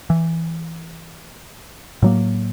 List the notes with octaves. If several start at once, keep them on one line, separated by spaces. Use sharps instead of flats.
E3
A2 F#3 A#3